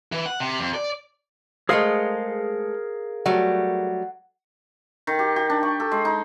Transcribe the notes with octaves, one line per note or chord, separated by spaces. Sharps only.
E3
F#5
C3
F2
D5
G#3 A3 G#4 A#4 C5 F5
F#3 G3 A3 F#5
D#3
G4
G4
D4
C#6
A4
G#3
D#4